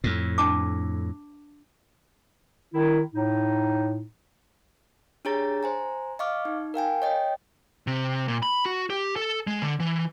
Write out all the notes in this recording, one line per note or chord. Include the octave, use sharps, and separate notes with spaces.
F2 A2
D4 A5 D6
D#3 E4
A2 D#4
D4 G4 G#4 C#5 A#5 A6
C5 G#5 A#5
D#5 F5 C#6 D6 F6
D#4
A#4 F5 G5 G#5
C#5 D#5 G5
C3
A#2
B5
F#4
G4
A4
G#3
D3
E3